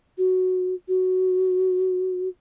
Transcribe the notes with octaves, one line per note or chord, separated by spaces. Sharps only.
F#4
F#4